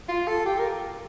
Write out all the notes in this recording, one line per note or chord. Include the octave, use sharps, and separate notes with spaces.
F4
A4
G4
A#4